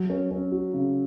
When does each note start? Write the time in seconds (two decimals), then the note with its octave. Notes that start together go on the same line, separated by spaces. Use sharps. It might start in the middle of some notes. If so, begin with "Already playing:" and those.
Already playing: F#3
0.10 C#4
0.31 C#4
0.52 F#4
0.74 C#3